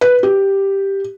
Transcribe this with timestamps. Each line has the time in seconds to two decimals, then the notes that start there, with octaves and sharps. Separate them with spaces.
0.01 B4
0.23 G4